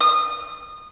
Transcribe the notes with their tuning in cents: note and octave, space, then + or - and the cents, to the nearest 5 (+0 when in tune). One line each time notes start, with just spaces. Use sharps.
D#6 -25